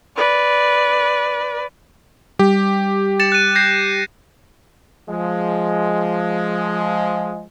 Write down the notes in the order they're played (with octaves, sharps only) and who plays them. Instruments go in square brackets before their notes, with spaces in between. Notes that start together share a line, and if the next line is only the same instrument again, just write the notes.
[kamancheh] B4 D5
[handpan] G3 [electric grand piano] G4
[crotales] A6 C#7 E7
F#6 D#7
G6 A#6 C7
[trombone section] F3 G#3